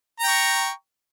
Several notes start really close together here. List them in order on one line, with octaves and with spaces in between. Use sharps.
A#5 G5 C#6